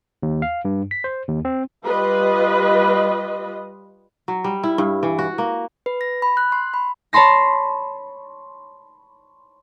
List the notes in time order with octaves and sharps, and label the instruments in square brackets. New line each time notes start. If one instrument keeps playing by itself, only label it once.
[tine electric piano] D#2
F5
G2
B6
C5
D#2
C4
[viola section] G3 F4 B4 D#5
[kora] F#3
G3
E4
G2
E3
F#4
A#3
[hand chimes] B4
A#6
B5
F#6
C6
B5
[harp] C#5 A5 B5 C6 A#6